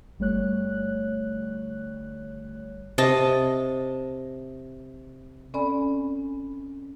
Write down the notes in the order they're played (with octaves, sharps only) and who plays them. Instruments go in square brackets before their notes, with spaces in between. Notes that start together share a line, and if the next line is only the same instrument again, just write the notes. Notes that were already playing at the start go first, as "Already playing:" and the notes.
[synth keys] G1 G3 A3 C#5 F#6
[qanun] C3 D#5 A5
[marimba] C4 C#4 A4 D5 G#5 B5